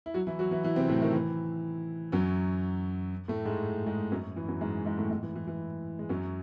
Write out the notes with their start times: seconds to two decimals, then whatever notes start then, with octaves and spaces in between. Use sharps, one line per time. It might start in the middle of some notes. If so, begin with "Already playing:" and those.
0.06 E4
0.14 F#3 F#4
0.27 E3 E4
0.39 F#3 F#4
0.51 E3 E4
0.64 E3 E4
0.76 C3 C4
0.89 A2 A3
1.02 D#3
1.13 E3
2.12 F#2 F#3
3.28 A2 A3
3.45 G#2 G#3
3.87 G#2 G#3
4.11 F#2 F#3
4.36 E3
4.48 F#2 F#3
4.61 G#2 G#3
4.85 G#2 G#3
4.98 A2 A3
5.11 G#2 G#3
5.23 E3
5.35 E3
5.47 E3
5.99 G#3
6.09 F#2 F#3